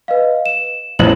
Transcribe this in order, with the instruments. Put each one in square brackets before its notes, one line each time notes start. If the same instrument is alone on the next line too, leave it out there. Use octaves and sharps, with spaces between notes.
[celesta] B4 D#5 F5
E7
[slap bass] A1 F2 [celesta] E4 C5 F#7